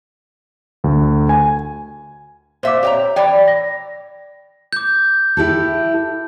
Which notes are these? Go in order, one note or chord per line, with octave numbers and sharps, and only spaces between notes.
D2
G#5
A#2 C5 E5 F5 D6
G4 C#5 G5 A#5
E3 C#5 D5 G5 B5
A#6
D6 G6
E4 G4 A4